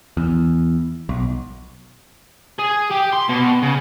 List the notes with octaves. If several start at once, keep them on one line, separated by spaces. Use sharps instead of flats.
E2
B1
G#4
G4
C6
B2
C#3